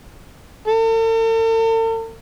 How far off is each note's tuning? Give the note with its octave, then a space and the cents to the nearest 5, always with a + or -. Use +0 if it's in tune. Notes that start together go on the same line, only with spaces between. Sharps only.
A4 +45